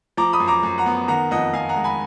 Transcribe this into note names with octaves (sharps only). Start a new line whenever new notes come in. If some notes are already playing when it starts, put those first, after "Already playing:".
F3 A#5 D6
B5 D#6
F#2
A#5 D6
F#2
F#5 A#5
B3
D#3 F#5 A#5
F2 D#5 F#5
F2 F5 G#5
F#5 A#5
G#3
G#5 B5